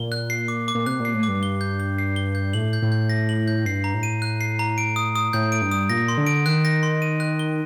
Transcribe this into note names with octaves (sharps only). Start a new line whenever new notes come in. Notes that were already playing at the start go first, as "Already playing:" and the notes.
Already playing: A#2 G7
F#6
C7
D6
D6
A#2
C3 F#6
A#2
C7
A2
D6
G2
G7
G6
G6
C7
G7
G6
A2 F#7
G6
A2
G6
A#6
F#7
G6
G2 C7
A#5
A2
D#7
F#6
C7
A#5
D7
D#6
D#6
A2 G6
D7
G2
D#6
A#2 A#6
C6
D3
D7
D#3 F#6
A#6
C6
D#7
F#6
G7